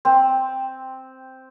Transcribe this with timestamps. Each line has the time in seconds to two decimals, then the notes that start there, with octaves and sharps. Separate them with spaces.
0.05 C4